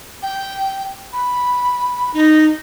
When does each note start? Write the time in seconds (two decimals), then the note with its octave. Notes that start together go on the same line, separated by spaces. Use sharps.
0.23 G5
1.13 B5
2.14 D#4